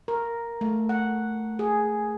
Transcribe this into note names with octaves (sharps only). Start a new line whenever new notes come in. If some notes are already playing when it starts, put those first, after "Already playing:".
A#4
A3
F#5
G#4